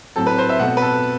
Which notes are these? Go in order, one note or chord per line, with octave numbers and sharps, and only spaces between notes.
A2 F#3 C4 A4
B4
C5
E5
B2 A3 C4 F#5
B4
A4